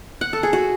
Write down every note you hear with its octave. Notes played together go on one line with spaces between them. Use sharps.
F#5
A4
G#4
F#4